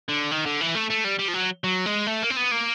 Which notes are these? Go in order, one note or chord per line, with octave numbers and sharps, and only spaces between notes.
D3
D#3
D3
E3
A3
A3
G3
G3
F3
F#3
F#3
G#3
A3
A#3
C4
B3
A#3